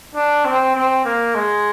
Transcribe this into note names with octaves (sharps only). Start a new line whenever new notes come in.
D4
C4
C4
A#3
G#3